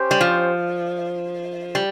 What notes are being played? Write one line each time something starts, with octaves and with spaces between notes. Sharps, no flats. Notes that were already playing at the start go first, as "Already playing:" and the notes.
Already playing: C#4 G4 C5
G3
F3
G3